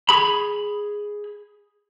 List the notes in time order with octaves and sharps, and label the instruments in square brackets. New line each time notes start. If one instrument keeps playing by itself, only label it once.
[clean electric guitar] G#4 B5